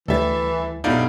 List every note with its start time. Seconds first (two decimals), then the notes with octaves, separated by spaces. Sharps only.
0.08 D2 E3 G3 A4 E5 A6
0.84 B1 G2 D#4 E4 D5 F5